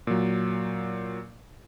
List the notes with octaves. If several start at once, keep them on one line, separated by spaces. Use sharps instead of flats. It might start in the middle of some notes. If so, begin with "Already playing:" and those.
A#2 F#3